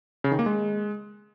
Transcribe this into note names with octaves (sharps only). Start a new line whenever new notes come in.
C#3
D#3
A#3
G#3